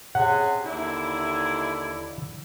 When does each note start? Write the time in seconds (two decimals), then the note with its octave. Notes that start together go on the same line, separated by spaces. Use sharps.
0.15 C3 C#4 G#4 F#5
0.64 D#2 D3 E4